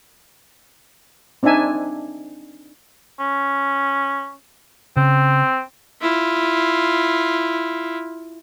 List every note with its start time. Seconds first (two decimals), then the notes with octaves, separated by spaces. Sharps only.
1.43 C4 D4 D#4 E5 G#5
3.20 C#4
4.96 C#3 C4
6.01 E4 F4